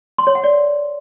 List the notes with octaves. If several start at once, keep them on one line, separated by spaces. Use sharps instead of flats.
C6
C#5
F#5
D5